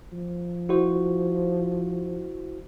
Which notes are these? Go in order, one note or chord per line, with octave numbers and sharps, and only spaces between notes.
F3
E4 F#4 C5